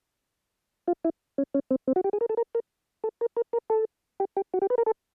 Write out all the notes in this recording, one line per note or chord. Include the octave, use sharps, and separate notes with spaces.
F4
E4
C#4
C#4
C4
C4
F#4
G4
G#4
A#4
A4
A#4
A#4
A4
A#4
A#4
A#4
A4
G4
G4
F#4
G4
B4
A#4
A4